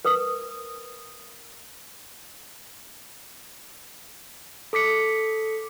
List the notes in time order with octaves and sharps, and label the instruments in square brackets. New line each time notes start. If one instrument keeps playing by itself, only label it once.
[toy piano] A#4 B4 D#6
[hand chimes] A4 D6 B6 C#7